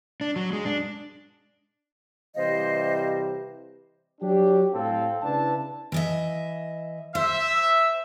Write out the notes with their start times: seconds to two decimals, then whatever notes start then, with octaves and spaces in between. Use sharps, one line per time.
0.21 D4
0.36 F#3
0.53 G#3
0.65 D4
2.35 C3 E3 G3 C5 D#5 F5
4.21 F#3 D4 G4
4.73 A2 C4 A4 F5
5.22 C#3 D4 E4 B4 A5
5.92 E3 D#5 E5
7.15 C5 E5